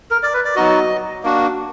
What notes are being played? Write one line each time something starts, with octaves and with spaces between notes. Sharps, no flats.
A#4
D5
B4
D5
F#3 B3 D#4 F#4 D#5
A#3 D4 F#4